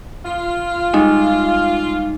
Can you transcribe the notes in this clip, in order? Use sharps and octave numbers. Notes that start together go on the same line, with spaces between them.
F4
G3 G#3 D#4